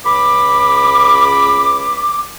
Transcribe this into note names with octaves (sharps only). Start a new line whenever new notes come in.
C#2 B5 D6